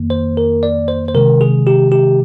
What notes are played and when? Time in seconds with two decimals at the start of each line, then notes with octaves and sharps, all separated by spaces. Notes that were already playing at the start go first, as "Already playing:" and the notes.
Already playing: F2 D#3 A#3
0.10 C5
0.37 A#4
0.63 D5
0.88 C5
1.08 C5
1.14 C3 D#3 G#3 A#4
1.41 G#4
1.67 G4
1.92 G4